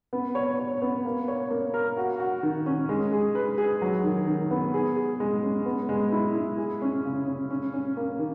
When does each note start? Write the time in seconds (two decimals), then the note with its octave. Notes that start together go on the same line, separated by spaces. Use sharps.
0.13 B3
0.35 C#5
0.59 C#5
0.82 B3
1.05 A#3
1.28 C#5
1.51 A#3
1.74 A#4
1.97 F#4
2.20 F#4
2.43 D#3
2.66 C#4
2.89 G#3
3.12 G#4
3.35 B4
3.58 G#4
3.82 F#3
4.04 D#3
4.27 D#3
4.51 B3
4.74 G#4
4.97 G#4
5.20 G#3
5.43 C#4
5.66 B3
5.89 G#3
6.12 E4
6.35 E4
6.58 G#4
6.82 C#4
7.05 C#3
7.27 C#4
7.50 C#4
7.74 C#4
7.97 A#3
8.19 D#3